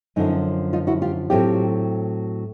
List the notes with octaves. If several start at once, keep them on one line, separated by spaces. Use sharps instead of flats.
F#2 D3 F3 C#4 D#4
D#4 F4
E4 F#4
F4 G4
A2 F#3 A3 C4 F4 G4